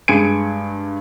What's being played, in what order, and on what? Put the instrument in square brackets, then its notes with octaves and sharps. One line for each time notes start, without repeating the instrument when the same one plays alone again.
[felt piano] G2 G#3 G#5 G#6 C#7 D7